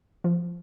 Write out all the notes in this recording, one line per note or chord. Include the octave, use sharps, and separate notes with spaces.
F3